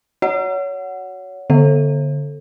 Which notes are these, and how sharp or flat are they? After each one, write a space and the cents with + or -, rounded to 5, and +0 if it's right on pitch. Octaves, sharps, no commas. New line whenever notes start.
F#4 +0 C#5 +25 F#5 +0
D3 -15 A4 +0 E5 +40